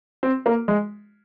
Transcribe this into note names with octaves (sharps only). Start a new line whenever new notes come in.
C4
A#3
G#3